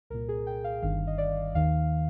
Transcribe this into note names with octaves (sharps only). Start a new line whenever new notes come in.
C2 A#2 A#4
G#4
G5
F5
G1 G2 D#3 F5
D#5
D5
D#2 D#3 F5